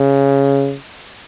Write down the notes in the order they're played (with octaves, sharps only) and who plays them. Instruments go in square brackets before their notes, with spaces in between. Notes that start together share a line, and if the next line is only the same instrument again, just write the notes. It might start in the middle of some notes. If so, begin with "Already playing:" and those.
Already playing: [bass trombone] C#3